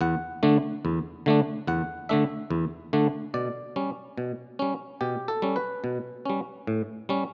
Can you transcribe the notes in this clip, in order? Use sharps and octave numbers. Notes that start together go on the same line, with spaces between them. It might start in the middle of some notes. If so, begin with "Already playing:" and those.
E2 F#5
D3 A3 D4
E2
D3 A3 D4
E2 F#5
D3 A3 D4 E5
E2
D3 A3 D4
B2 D5
G3 C#4
B2
G3 C#4
B2 G4
A4
G3 C#4
B4
B2
G3 C#4
A2
G3 C#4